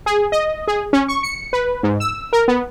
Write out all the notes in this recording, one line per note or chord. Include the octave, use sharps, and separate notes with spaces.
G#4
D#5
G#4
C#4
C#6
C#7
B4
G#2
E6
A#4
B3